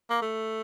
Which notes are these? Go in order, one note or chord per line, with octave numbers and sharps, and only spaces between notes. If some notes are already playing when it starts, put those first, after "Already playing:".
A#3
A3